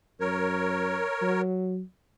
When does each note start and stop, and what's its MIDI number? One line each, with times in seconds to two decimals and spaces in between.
0.20 1.00 42
0.20 1.41 70
0.20 1.41 73
1.22 1.80 54